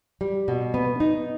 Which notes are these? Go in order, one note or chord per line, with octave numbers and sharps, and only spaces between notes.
G3
B2
B3
D#4